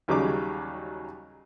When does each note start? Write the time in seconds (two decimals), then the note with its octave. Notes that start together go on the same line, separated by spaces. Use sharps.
0.08 D#2 C#3 F#3 G3 D#4 D6